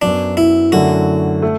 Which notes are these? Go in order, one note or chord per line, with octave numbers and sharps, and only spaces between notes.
F#2 F#3 B3 D4
E4
F#2 D3 F#3 A3 E4 F#4
A3